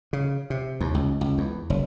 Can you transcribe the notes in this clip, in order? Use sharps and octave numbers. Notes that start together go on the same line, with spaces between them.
C#3
C3
D#2
C#2
C#2
E2
F#1